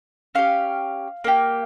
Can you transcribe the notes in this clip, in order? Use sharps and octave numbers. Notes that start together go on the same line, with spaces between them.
C#4 G4 F5
A#3 D#4 G4